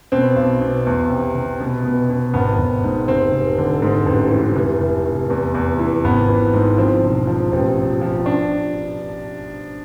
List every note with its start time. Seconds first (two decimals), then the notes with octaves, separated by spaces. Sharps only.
0.12 B2 C4
0.36 B1
0.61 B2
0.87 E2
1.10 C3
1.35 C3
1.60 B2
1.85 B2
2.10 B2
2.34 G#1 B3
2.59 G#1
2.84 G#2
3.08 F1 C4
3.33 F1
3.58 D3
3.82 G#2
4.06 A1
4.31 E3
4.56 F1
4.81 F1
5.05 F1
5.30 E2
5.54 E2
5.79 E3
6.04 G#1 B3
6.28 E3
6.54 G#2
6.78 F3 C4
7.03 E1
7.27 F3
7.52 A1 C4
7.76 F3
8.02 F3
8.26 D4